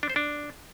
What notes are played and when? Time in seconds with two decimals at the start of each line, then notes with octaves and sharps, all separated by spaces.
0.03 D4
0.09 C5
0.16 D4